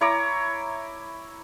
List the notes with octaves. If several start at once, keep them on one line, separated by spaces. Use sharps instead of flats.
E4 C#5 A#5 D6